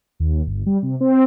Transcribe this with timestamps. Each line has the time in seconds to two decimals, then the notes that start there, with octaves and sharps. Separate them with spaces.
0.20 D#2
0.47 G1
0.66 G3
0.83 C3
1.01 C4